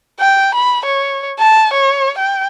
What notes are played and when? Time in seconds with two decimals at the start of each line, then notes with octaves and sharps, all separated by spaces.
0.20 G5
0.55 B5
0.86 C#5
1.39 A5
1.74 C#5
2.18 G5